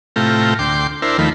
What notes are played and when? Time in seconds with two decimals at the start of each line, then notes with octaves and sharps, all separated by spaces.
0.16 A2 C3 A3 F4 G5 A#5
0.59 D2 G5 C6 D6
1.02 D4 E4 A#4 C5
1.18 D#2 D#3 F3 A3 B5